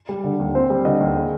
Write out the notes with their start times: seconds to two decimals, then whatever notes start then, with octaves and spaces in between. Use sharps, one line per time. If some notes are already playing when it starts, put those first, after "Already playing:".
0.09 G3
0.24 D3
0.39 D#2
0.55 C4 C5
0.70 G3
0.85 D3 D#5
1.01 D#2
1.16 G#4